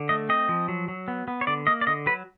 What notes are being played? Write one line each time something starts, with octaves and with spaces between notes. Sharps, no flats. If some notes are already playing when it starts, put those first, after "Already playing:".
Already playing: D3
A3 D#5
C4 D#5
F3
F#3
F#3
B3
B3
C#5
D3 D5
A#3 D#5
D5
D3 D#5
F#3 B4